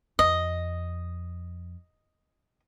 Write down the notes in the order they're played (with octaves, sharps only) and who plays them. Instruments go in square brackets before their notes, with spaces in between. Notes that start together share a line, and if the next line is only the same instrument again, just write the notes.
[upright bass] F2 [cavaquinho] D#5